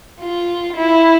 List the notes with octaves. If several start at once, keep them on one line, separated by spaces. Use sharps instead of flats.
F4
E4